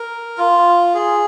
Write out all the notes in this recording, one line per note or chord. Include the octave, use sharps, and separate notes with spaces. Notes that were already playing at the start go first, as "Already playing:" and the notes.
Already playing: A#4
F4
G#4